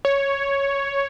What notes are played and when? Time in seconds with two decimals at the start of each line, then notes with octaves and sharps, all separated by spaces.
0.05 C#5